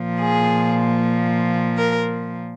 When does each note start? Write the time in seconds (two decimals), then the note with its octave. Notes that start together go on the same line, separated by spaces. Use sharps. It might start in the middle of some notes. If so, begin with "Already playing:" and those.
Already playing: A#2 F3
0.21 G#4
1.78 A#4